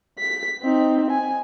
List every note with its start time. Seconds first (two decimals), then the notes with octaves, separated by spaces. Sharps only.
0.19 B6
0.63 C4 D#4
1.11 G#5